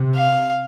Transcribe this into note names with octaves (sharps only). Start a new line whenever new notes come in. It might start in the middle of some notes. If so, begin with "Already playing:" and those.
Already playing: C3
F5